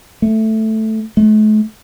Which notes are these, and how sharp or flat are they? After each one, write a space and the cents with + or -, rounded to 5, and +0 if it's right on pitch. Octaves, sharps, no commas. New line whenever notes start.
A3 +0
A3 -45